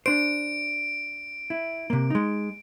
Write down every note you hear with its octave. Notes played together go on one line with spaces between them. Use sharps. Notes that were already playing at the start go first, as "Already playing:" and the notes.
D4 C5 D7
E4
C3 A#3
G#3 D#4